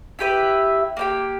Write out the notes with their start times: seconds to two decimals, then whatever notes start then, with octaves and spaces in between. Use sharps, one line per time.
0.19 E4 G4 B4 E5
0.97 A#3 D#4 G4